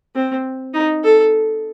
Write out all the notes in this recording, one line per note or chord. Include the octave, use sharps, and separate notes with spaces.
C4
D#4
A4